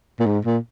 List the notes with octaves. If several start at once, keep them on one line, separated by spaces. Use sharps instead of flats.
A#2
G#2
A#2